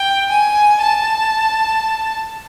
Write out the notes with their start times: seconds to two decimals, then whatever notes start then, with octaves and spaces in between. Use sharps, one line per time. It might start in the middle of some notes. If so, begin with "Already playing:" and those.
Already playing: G5
0.31 G#5
0.80 A5